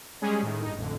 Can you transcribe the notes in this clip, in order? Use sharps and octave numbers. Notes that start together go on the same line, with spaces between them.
G3 G#3 C#4 G#4
A2 D#3
G1 D#4
A1 F2 D3